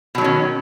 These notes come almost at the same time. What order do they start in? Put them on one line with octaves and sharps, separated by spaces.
B2 F#3 D#3 C#4